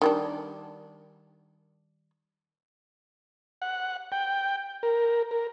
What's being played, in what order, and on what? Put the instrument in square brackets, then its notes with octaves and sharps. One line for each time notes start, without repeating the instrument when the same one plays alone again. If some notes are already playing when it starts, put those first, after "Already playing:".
[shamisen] D#3 G3 D4
[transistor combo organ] F#5
G5
A#4
A#4